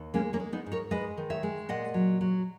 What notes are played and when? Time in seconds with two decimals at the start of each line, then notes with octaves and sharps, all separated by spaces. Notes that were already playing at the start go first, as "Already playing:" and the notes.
Already playing: D#2
0.14 G#3 A#3 C#4
0.33 A#3 C#4
0.40 G#3
0.53 B3 D#4
0.66 G#2
0.72 A#4 C#5
0.91 G#3 B4 D#5
1.18 D#3
1.30 C#5 E5
1.43 G#3
1.69 A#2 D#5 F#5
1.94 F#3
2.21 F#3